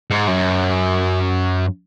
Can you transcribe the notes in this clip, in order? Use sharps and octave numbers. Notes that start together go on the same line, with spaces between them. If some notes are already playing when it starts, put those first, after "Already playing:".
G#2
F#2